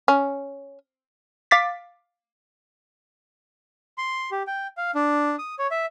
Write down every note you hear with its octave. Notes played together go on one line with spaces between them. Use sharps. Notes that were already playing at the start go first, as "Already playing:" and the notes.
C#4
F5 D6 A6 B6
C6
G4
G5
F5
D4
D#6
C#5
E5